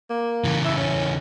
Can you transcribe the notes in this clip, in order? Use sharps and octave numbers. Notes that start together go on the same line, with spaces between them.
A#3
C#3 E3
E4
C#4